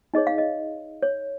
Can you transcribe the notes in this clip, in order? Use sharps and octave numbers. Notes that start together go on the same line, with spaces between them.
D#4 G#4 C#5 D#5
F5
D#5
C#5